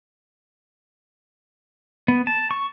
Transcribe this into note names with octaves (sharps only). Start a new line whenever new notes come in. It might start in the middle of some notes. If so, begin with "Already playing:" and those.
B3
A5
C#6